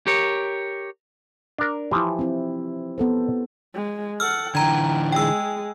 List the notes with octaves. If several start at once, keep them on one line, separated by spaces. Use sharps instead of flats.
G4 A#4 C#5
D4 A#4
E3 F3 E4 G4
C4 E4
B3 A4 C5
G#3
A4 F#5 E6 F6
D3 E3 G5 A#5 G#6
G#3 G#4 G5 E6